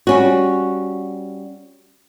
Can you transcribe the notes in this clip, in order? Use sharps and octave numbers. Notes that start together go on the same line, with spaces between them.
G3 C#4 F#4